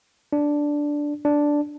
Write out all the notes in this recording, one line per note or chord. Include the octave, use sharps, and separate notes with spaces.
D4
D4